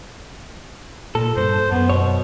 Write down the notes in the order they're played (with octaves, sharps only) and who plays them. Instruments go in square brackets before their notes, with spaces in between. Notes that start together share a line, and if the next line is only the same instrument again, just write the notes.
[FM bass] A#2 [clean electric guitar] A4
[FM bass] G2 [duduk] C5
[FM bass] F#2 [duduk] B3
[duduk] B2 [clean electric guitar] C#5